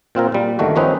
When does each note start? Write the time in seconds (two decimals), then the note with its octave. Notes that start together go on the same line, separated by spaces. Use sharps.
0.15 A#2 C4 F4 A#4
0.32 A#2 G3
0.59 G1 G2 D#3 A3 F#4
0.76 D#3 F3 C4 C#4 D#4 B4